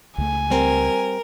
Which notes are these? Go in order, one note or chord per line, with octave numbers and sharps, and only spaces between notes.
C#2 A3 G#5
G3 C4 A#4